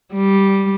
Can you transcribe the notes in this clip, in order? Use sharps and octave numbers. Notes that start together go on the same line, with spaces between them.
G3